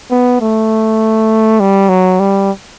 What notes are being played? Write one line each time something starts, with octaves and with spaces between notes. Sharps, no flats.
B3
A3
G3
F#3
G3